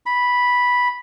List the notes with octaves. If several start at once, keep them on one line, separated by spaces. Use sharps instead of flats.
B5